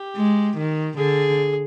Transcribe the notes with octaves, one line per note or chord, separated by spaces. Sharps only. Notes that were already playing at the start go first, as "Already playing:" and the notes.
Already playing: G4
G#3
D#3
D3 G#4